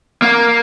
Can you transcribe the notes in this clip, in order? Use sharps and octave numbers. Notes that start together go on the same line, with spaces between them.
A#3